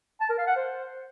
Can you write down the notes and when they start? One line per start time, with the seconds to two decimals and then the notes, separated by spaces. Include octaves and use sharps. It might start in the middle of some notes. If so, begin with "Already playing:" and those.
0.20 A5
0.29 A#4
0.38 F5
0.47 F#5
0.56 C5